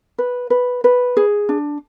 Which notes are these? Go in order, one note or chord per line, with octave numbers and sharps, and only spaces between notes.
B4
B4
B4
G#4
D4